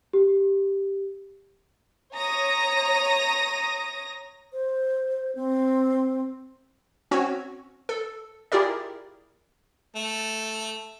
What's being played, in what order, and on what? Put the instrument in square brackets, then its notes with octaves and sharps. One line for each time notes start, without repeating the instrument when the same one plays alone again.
[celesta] G4
[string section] C#5 A#5 D#6 A#6
[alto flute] C5
C4
[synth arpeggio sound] C4 C#4 F#4 C#5
A4
E4 F4 G4 G#4 A#4 D5
[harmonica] A3